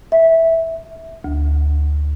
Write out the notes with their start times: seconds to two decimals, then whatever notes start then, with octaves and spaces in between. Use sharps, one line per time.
0.12 E5
1.24 D2